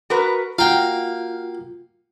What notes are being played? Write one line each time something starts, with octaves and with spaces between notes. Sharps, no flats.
F#4 A#4 B4
A#3 F4 F#4 F5 G5